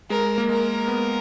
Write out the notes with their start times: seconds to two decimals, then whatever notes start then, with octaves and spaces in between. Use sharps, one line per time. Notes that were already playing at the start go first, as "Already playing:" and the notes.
0.10 G#3 A#4
0.38 A#3
0.49 G#3 A#4
0.88 B3